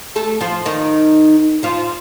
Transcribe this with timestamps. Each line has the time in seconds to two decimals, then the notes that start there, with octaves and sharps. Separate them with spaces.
0.16 A3 A4
0.41 F3 F4
0.66 D#3 D#4
1.63 F3 F4